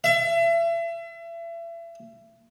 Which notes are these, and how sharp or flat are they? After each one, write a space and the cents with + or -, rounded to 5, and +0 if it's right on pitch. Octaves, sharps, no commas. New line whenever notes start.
E5 +35